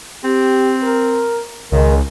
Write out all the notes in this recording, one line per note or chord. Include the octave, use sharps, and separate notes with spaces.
C4 G4
A#4
C#2 D#3 G#3